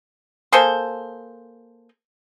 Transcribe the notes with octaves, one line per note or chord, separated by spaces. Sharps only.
A#3 G#4 A4 C5